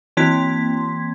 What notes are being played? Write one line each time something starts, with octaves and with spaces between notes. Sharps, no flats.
E3 A#3 C4 C6 G#6 B6